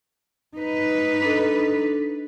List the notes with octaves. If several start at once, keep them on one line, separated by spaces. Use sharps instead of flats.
D#4 B4
D4 A4